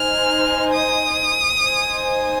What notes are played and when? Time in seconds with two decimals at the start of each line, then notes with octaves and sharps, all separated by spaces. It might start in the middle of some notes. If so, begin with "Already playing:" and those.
Already playing: D#4 C5 G#5 F6
0.73 D#6
1.62 D#4 C5 G#5